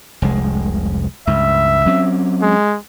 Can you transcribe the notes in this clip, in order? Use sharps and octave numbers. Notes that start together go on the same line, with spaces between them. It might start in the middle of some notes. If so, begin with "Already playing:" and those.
F1 C2 G#3
C#2 G2 E5
F#3 C4 C#4
G#3